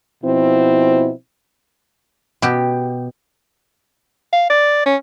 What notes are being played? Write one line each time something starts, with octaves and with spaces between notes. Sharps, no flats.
B2 F3 C4 E4
B2 G4
F5
D5
C#4